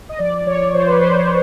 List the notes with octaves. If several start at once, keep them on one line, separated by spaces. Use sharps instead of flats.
D#5
F3 D5
F3 C#5
F3 C5
B4
F3 C5
B4